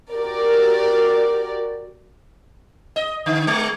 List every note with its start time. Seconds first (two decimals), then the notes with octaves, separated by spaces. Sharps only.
0.13 F#4 G4 A#4 D5
2.96 D#5
3.26 D3
3.47 G#3